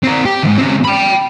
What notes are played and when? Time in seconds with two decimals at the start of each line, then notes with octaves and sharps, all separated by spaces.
0.04 C4 A#4
0.25 G4
0.43 D2 G#2
0.58 C#3 C4
0.84 G5 B5